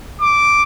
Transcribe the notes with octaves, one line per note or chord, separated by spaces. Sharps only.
D6